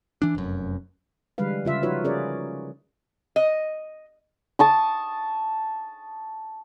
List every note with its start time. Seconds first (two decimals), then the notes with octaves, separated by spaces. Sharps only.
0.22 E3 D4
0.35 F1 F#2
1.38 D3 E3 G3 G#3 B4 F5
1.65 C#3 F4 E5
1.83 F3 D#4 F4 F#4 B4 C#5
2.04 C#4 G#4 A#4 C#5 D5
3.36 D#5
4.59 A5 C#6 D#6